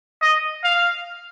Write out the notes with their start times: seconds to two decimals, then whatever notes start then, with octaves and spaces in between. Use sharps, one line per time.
0.21 D#5
0.64 F5